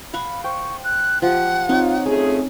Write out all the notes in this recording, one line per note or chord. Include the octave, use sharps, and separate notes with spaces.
F5 F#5 B5 C#6
C5 G5 C#6
F#6
F3 G4 F#5
C4 D#4 F4 C#5
A3 C#4 F4 G#4